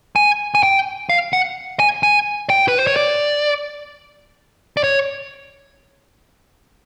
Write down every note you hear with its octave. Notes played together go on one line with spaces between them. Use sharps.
G#5
G#5
G5
F5
F#5
G#5
G#5
G5
B4
C5
C#5
D5
D5
C#5